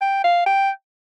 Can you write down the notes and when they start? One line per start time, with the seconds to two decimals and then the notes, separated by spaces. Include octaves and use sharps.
0.01 G5
0.24 F5
0.46 G5